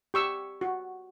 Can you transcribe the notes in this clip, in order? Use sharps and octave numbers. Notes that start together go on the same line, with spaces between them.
G4 C#6 E6
F#4